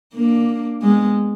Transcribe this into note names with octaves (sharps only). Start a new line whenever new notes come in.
A#3 D4
G#3 B3